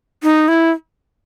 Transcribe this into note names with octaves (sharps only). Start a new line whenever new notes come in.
D#4
E4